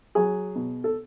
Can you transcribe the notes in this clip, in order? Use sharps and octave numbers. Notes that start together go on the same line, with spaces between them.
F#3 G#4
B2
A4